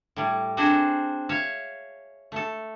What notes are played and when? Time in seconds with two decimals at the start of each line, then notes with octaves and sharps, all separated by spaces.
0.16 A2 G3
0.57 C4 D4 F#4 G#4 C5
1.29 C#5 E5 F5
2.32 A3 A4